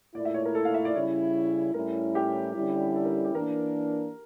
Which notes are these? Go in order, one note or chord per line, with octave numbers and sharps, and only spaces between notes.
A#2 A3 E4 D5
E5
C#5
A#4
A4
F5
E5
D5
C#3 G3 C#4 E4 C#5
A2 G3 C#4 E4 A#4
G4
D3 G3 C#4 E4
A4
A#4
G4
E3 A#3 D4 A#4